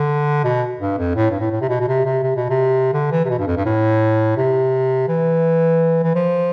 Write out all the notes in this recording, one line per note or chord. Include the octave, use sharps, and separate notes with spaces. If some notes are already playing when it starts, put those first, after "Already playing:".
Already playing: D3
B2
G2
F2
A2
G2
A2
A2
C3
B2
B2
C3
C3
C3
B2
C3
D3
E3
C3
B2
G2
F2
G2
A2
C3
E3
E3
F3